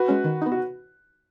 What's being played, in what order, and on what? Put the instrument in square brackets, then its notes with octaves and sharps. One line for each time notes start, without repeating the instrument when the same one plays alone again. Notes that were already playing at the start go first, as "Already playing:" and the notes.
Already playing: [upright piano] F#4 B4
[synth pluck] G#3 C#4
D#3
B3 D#4
[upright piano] F#4